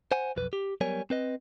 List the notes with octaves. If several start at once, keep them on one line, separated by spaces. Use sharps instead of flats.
C5 F#5 G#5
B1 F2 B4
G4
F#3 G3 B3 A#4 C#5 G#5
C4 B4 D#5